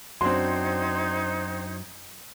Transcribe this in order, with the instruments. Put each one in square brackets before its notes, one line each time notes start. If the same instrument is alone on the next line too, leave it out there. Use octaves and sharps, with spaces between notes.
[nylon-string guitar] F#2 D4 [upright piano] C4 F#4 [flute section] D#4 C5 G#6 [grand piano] C6